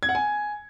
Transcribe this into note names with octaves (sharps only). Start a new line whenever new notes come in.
G#6
F#5
G#5